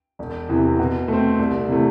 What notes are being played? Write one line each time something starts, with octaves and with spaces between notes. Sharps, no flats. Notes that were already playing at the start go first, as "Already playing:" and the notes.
E1
E2 C3 E3
B2
A3 C4
C2
C3 E3 A3